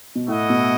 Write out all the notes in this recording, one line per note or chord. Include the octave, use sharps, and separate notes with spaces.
B2
A2 A3 E4 A4 D#5 F#5
B2